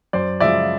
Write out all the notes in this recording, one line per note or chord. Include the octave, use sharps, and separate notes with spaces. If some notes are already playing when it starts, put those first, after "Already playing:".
F#2 C5 D5
C#3 F3 G#3 D5 E5